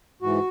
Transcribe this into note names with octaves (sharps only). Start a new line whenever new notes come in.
G#2 E3 F#4